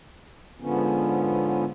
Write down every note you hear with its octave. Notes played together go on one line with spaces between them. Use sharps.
G#2 D3 F3 B3 C#4